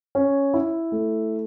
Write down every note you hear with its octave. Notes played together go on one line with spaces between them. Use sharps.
C#4
E4
A3